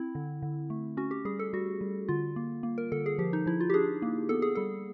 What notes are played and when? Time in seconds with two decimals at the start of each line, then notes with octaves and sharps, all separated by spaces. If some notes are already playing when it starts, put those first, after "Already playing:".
Already playing: C4 E4
0.15 D3
0.42 D3
0.70 A3
0.97 C#4 F#4
1.11 G4
1.25 G3 G#4
1.39 A4
1.53 G3 F#4
1.81 G3
2.09 D3 F4
2.36 A#3
2.63 A#3
2.78 A#4
2.92 D3 A4
3.06 G#4
3.18 F3 G4
3.33 D#4
3.46 F3 E4
3.61 F4
3.70 G4
3.74 D4 G#4
4.02 A#3
4.29 B3 A4
4.42 G#4
4.55 G3 A4